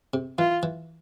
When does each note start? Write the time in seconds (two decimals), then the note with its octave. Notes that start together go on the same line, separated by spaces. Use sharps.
0.14 C3
0.38 E3 F4
0.63 E3